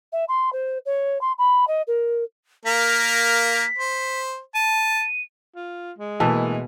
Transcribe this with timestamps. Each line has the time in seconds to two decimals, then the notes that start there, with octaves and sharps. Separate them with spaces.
0.12 E5
0.29 C6
0.53 C5
0.86 C#5
1.21 C6
1.38 B5
1.67 D#5
1.87 A#4
2.66 A#3 A#4 F5 B6
3.78 C5
4.55 A5 D#7
5.56 F4
5.99 G#3
6.20 B2 E3 A3 A#3 E5 A5